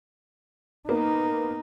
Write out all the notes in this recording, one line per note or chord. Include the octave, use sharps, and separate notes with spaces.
A#3 B3 D#4